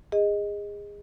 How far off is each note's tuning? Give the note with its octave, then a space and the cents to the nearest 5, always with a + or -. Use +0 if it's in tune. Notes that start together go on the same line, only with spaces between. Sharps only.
G#4 -25 D#5 +0